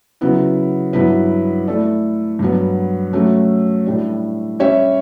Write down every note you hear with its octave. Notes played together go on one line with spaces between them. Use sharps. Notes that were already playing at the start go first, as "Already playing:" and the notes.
C#3 F#3 B3 E4
G2 F#3 B3 E4 B4
A3 E4 A4 D5
G2 F#3 B3
F#3 A3 C#4 G4
A2 G3 D4
G3 C#4 G4 C#5 E5